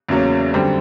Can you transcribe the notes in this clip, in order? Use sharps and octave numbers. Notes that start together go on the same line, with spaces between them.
E2 C#3 F#3 A#3 C#4
F#2 D3 G3 C4